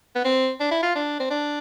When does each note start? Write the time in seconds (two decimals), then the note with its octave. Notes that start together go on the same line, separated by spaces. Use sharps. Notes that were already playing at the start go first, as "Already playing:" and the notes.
0.15 B3
0.25 C4
0.60 D4
0.71 E4
0.83 F4
0.95 D4
1.20 C4
1.31 D4